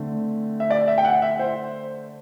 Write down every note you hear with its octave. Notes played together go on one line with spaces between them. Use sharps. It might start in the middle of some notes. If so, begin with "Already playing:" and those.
Already playing: D3 A3 C4
E5
D5
E5
G5
F#5
E5
C5